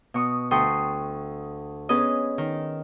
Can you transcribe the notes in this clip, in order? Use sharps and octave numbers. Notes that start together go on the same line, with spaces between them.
B2 C#6 D#6
D2 A4 G5 C6 C#6 D#6
B3 C#4 G#4 B4 D#5
D#3